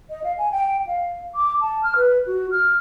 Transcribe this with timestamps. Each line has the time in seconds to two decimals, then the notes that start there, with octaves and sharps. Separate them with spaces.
0.10 D#5
0.24 F5
0.38 G#5
0.52 G5
0.87 F5
1.35 D6
1.61 A5
1.83 F6
1.96 B4
2.27 F#4
2.51 F6